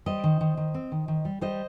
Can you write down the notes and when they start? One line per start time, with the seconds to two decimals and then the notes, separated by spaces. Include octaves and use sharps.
0.06 G3 C5 D#5
0.24 D#3
0.41 D#3
0.57 D#3
0.74 C4
0.92 D#3
1.08 D#3
1.25 G3
1.41 G3 C5 D#5